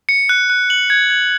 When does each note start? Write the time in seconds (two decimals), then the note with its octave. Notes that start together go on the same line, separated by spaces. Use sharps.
0.09 C#7
0.29 F#6
0.50 F#6
0.70 F#7
0.90 G#6
1.10 G#6